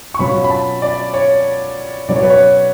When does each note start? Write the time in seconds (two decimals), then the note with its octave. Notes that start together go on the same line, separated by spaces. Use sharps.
0.14 C#6
0.19 B2 F#3 C#4 F4 B5
0.44 B5
0.50 A5
0.82 D5
1.14 C#5
2.08 B2 F#3 C#4 D5
2.16 C#5
2.23 B4
2.30 C#5